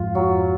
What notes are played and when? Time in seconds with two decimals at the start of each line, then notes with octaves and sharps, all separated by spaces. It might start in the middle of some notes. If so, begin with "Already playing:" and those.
Already playing: F2 G#2 F4
0.15 F#3